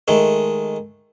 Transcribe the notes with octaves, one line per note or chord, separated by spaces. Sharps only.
D#3 G#3 A3